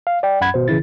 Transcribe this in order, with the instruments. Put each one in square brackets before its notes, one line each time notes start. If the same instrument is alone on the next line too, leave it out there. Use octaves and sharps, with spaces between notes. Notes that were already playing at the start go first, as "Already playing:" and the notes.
[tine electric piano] F5
D5 G5
A1 F#2 F#5 B5 G#6
G#1 B2 C5
A1 C#3 E3 E4 A6